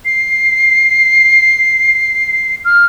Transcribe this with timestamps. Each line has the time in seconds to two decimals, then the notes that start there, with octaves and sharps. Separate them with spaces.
0.05 C7
2.65 F6